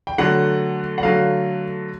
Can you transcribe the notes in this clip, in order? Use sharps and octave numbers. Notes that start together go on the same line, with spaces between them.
G5
D3 F#3 A3 F#5
F#5
D3 F#3 A3 F5